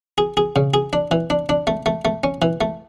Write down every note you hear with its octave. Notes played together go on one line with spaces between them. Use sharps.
G#4
G#4
C#3
G#4
D4
E3
D4
D4
A3
A3
A3
C#4
E3
A3